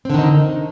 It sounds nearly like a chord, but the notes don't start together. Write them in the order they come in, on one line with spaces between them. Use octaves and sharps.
C4 D3 D#3 D#4